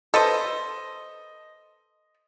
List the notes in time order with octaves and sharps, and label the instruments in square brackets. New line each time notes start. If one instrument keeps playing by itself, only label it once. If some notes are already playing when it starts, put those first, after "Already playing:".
[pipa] A4 B4 C5 [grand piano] D#5